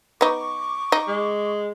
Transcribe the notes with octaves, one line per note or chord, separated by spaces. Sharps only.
B3 D#4 C#6 D6
D#4
G#3